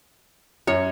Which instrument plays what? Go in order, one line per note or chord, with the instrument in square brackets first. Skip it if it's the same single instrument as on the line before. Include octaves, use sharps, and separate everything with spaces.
[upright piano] F#2 [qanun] C#5